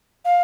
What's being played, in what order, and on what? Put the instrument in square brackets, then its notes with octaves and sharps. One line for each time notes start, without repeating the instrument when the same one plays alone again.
[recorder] F5